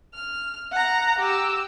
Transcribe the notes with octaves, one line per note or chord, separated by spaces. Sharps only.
F6
F#5 A#5
G4 E6